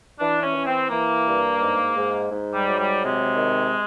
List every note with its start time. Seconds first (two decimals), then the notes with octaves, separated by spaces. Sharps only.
0.20 E3 D4
0.43 C#4
0.55 E3
0.66 C4
0.90 E3 A#3
1.26 G2
1.61 G#2
1.97 G#2
2.31 G#2
2.55 G3
2.66 F#3
2.79 G3
3.02 C3 G#3
3.36 D#3